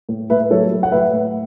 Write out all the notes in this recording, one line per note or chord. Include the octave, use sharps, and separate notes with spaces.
A2
A2 B4 E5
F#3 A4 C#5
F#3
F#5
A2 B4 E5
A2